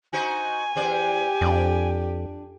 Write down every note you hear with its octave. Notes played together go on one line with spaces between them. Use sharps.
D#4 F#4 C5 G#5
E2 G4 C5 D5
F2 D4 D5